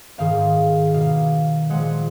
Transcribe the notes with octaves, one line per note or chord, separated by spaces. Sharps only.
G#2 D#3 A#3 F5
B2 A#3 F5
A#2 F3 G#3 F#5